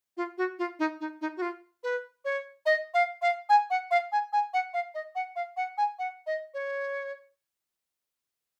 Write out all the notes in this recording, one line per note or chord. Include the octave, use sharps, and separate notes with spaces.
F4
F#4
F4
D#4
D#4
D#4
F#4
F4
B4
C#5
D#5
F5
F5
G#5
F#5
F5
G#5
G#5
F#5
F5
D#5
F#5
F5
F#5
G#5
F#5
D#5
C#5